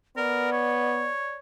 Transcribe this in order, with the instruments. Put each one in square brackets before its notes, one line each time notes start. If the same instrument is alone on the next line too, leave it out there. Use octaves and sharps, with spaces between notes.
[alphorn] B3 [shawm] A#4 [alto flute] D5
[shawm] C#5